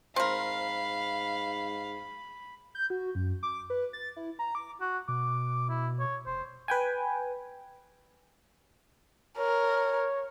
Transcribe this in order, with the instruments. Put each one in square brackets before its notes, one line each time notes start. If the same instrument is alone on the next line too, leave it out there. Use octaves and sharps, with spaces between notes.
[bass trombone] G#2 [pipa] C4 A#4 [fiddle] F5 [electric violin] B5
[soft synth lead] G6
F#4
F#2
D6
B4
A6
E4
A#5
D6
[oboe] F#4
[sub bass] B2 [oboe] D6
[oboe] E4
C#5
[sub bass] F1 [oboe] C5
[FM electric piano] B4 G5 G#5
[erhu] A#4 [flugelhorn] C#5